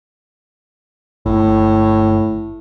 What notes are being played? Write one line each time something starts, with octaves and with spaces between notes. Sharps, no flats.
G1 A2